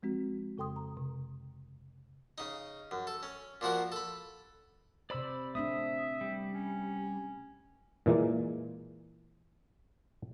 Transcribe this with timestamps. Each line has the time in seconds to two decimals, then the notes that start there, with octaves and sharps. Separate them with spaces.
0.03 F3 G#3 C4 F#4
0.57 F2 C#3 A4 G5 C6 D#6
0.76 A#5
0.97 C3
2.38 C#3 D#4
2.91 F#2
3.07 A4
3.23 C#4
3.61 A#2 F3 F#4 A#4
3.92 A4 B5
5.10 C3 C5 D5 B5 E6
5.55 A3 C4 D4 E5 D#6
6.21 G3
6.54 C#4
8.06 A#2 E3 G#3 A#3